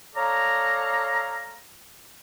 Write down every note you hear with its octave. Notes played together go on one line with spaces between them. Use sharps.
A4 C#5 D5 F5 A#5